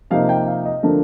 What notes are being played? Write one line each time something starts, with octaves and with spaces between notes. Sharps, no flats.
C3 F3 A#3 D#4 F5
G5
F5
D#5
D3 F3 A3 D4 A#4